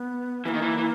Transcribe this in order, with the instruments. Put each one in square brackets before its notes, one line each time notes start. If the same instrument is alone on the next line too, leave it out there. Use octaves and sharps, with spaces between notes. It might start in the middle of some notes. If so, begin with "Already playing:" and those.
Already playing: [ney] B3
[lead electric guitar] E3 [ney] A#3 B3
[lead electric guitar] D#3
E3
E3